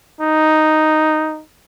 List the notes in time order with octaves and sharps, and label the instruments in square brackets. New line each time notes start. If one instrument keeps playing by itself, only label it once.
[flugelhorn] D#4